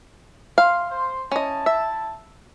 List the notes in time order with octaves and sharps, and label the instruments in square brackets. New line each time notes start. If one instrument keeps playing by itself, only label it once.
[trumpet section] E5 C6 [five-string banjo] F5
[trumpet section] C5
[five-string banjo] C#4 D#5 [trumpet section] E4 A5
[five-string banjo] E5